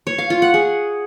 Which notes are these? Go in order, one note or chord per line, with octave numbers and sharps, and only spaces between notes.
C#5
F5
F4
F#5
G#4